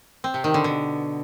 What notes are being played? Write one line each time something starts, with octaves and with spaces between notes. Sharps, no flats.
C4
C3
D#3
D3
B2